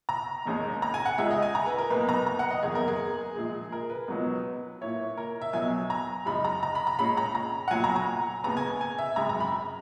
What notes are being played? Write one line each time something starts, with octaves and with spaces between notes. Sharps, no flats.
A#5
E1 D#2 D#3 G#3 C#4
A#5
G#5
F#5
C#2 C#3 G#3 D#4 E5
D#5
G#5
A#5
B4
A#4
B1 B2 A#3 D#4 B4
A#5
A#5
F#5
D#5
F#1 E2 D#3 G#4
A#4
G#4
A#1 A#2 G#3
A#4
B4
C#2 B2 F#3 B3 D#4
A#2 A#3 E4 C#5
A#4
E5
B1 B2 F#3 G#5
A#5
F#2 C#3 G#3 D#4 B5
A#5
A#5
B5
A#5
A#2 G#3 C#4 B5
A#5
A#5
F#5
B1 A#2 F#3 G#5
A#5
A#5
D#2 C#3 G#3 B3 A#5
G#5
G#5
E5
G#1 F#2 C#3 G#3 A#5
A#5
B5